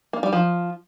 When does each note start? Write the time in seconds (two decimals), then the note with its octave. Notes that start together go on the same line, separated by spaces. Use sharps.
0.13 A#3
0.23 G3
0.33 F3